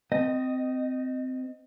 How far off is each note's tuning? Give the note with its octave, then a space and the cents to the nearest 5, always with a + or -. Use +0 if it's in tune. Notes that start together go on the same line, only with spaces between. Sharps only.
C4 -20 D#5 +0